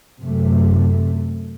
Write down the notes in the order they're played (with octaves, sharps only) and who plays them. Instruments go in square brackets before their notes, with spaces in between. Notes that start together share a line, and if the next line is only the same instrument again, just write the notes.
[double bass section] F#2 C3 A3